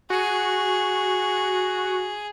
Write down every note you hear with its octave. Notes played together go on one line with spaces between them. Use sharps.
F#4 G#4